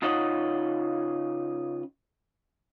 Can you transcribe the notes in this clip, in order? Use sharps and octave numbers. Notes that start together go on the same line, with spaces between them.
C#3 D#4 F4 C#5 D#5 F#5